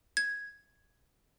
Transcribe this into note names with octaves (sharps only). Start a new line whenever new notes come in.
G#6